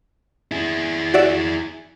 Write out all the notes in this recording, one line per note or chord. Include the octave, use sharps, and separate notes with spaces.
E4 G#4
F#4 D5 E5